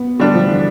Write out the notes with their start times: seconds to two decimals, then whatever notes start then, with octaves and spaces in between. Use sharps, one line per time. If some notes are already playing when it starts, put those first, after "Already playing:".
Already playing: B3
0.20 D3 G3 A3 D4
0.34 F3
0.48 E3